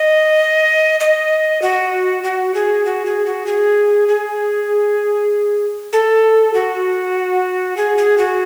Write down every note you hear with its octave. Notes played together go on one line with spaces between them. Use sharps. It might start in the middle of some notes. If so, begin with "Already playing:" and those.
Already playing: D#5
D#5
F#4
F#4
G#4
F#4
G#4
F#4
G#4
G#4
A4
F#4
G#4
G#4
F#4